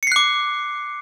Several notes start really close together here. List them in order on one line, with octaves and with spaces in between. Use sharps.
C#7 C7 F#6 D6